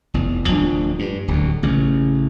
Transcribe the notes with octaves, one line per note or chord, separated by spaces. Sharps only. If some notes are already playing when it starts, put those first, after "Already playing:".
F1 E2
D1 F3 D4
G2
D1 D2
A1 C#3